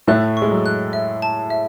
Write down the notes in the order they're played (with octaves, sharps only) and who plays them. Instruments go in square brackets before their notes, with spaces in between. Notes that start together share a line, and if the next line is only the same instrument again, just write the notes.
[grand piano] A2 A3 [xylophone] F#6
[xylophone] C#6
[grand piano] G#3
F#3
[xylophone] F#6
E5
A5
E5